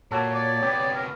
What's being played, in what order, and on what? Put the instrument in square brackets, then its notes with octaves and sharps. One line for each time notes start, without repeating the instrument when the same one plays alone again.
[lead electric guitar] A#2 [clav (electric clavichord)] A#3 F#4 A4 [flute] C#5
[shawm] D5
[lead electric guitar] C3 B3 [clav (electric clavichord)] G4
[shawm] A#4